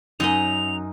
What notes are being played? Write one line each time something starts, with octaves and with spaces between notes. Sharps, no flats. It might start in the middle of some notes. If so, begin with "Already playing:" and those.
F#2 D#4 D#5 F7